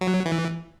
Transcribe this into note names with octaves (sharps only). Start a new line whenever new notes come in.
F#3
E3